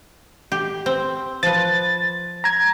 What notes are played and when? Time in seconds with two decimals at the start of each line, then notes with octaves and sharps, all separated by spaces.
0.52 G4
0.86 C4
1.43 F3 B4 A6
2.44 A#5 G#6